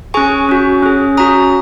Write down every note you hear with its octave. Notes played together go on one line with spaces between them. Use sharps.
C#4 G#4 G#5 C#6
C#4 F#4
C#4 G#4
C#4 F#4 A#5 D#6